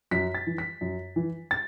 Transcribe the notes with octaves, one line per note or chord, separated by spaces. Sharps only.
F#2 B6
A6
E3
B6
F#2
E3
A6